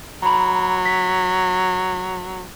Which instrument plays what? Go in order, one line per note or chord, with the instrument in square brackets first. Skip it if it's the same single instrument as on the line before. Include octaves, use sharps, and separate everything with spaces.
[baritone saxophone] F#3 [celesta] A#5 B5
[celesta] B6